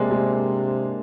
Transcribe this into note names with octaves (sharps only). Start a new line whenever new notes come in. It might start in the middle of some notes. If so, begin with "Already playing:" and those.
Already playing: C3 G#3 A#3 D4
G#3